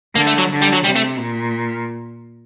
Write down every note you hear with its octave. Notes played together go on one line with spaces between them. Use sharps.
D3 A#3
A3
F#3
D3
G3
F#3
C3 G3
A3
A#2